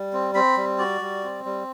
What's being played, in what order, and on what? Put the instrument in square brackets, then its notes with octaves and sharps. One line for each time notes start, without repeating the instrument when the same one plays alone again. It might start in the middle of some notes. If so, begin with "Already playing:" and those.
Already playing: [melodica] G3
C4
C4 B5
G3
F#4 D5
G3
C4
G3